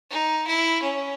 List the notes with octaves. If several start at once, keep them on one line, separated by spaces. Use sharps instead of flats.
D#4
E4
C#4